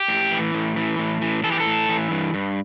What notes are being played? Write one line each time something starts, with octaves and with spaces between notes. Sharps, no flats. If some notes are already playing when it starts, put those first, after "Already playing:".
Already playing: G4
A2
E3
A2
E3
A2
E3
E3 A4
G4
A4
A2
E3
G2
G2